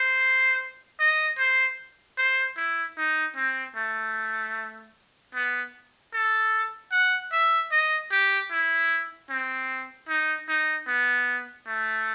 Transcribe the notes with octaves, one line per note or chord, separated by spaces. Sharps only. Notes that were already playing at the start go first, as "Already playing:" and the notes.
Already playing: C5
D#5
C5
C5
E4
D#4
C4
A3
B3
A4
F#5
E5
D#5
G4
E4
C4
D#4
D#4
B3
A3